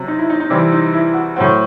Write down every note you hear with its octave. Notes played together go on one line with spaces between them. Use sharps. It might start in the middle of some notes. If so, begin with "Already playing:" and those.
Already playing: C3 F#3 C4
D#4
E4
D#4
D#4
C3 E3 G3 C4 E4
D#4
E4
F#4
A2 F#3 C4 F#4